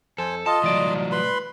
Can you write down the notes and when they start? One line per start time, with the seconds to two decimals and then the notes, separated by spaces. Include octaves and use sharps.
0.18 F2 A4 C5 G#5
0.46 F4 D#5 A5
0.64 C2 A2 E3 F#3 D5
1.12 B4 B5 C6